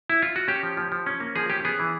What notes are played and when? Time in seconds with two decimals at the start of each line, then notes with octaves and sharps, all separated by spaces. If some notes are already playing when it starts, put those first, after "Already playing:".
0.10 E4
0.22 F4
0.36 F#4
0.48 C#4 G4
0.63 F3
0.77 F3
0.92 F3
1.06 C#4
1.20 A#3
1.36 F3 G#4
1.50 C#4 G4
1.65 B3 G#4
1.79 E3